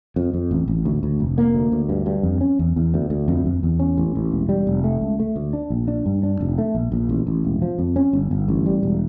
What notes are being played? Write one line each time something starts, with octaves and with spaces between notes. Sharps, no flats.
F2
F2
A1
A1
D2
D2
F1
A#3
D2
D2
G2
G2
F2
C#4
E2
E2
D2
D2
F2
F2
E2
C#4
A1
A1
E1
G3
F1
A3
C#2
A3
D2
D4
A#1
D4
G2
D4
F1
A3
A#1
A#1
A1
A1
E1
F3
F2
C#4
G1
G1
A1
G3
E1